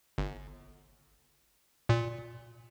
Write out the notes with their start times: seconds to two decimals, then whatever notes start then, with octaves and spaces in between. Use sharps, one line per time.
0.18 G1
1.89 A#2